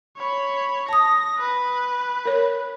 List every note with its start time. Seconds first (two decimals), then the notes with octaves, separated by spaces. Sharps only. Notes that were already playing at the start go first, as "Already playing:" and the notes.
0.17 C#5 B5
0.89 A5 D#6 A#6
1.39 B4
2.26 A#4 C#5